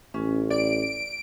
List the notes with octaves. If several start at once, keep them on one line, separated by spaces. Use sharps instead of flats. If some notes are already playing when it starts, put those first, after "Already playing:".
A1 C#4
D5 D7